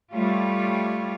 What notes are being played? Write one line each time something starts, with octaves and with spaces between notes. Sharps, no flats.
G3 A3 F4 C#5